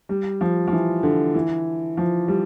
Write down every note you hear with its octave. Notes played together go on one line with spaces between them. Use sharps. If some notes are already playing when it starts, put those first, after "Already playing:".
G3
F3
F3
E3
D3
E3
F3
G3